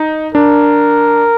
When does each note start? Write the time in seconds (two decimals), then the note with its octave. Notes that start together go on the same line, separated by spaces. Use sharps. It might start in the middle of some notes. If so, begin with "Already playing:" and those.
Already playing: D#4
0.35 D4 A#4